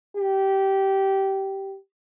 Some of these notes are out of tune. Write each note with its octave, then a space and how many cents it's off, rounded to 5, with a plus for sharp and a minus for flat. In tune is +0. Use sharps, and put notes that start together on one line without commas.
G4 -15